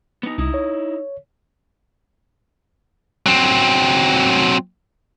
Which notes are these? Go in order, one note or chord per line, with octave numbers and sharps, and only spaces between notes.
B3 D#4
C2 D#4 E4
C#5
F#3 C4